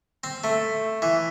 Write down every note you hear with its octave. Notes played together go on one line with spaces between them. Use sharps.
C4
A3
E3